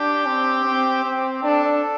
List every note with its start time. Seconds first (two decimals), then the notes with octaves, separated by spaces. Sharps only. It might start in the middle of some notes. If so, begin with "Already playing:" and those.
Already playing: D4 G4
0.26 C4
0.64 C4
1.04 C4
1.43 D4 A4